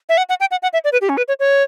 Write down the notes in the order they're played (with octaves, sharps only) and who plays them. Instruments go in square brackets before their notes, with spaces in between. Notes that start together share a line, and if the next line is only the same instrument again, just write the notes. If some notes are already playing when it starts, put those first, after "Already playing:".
[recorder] E5
F#5
F#5
G5
F#5
F#5
E5
D5
B4
G4
C#4
B4
C#5
C#5